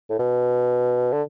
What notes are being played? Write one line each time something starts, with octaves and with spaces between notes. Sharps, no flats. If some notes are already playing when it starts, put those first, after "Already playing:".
A2
B2
D3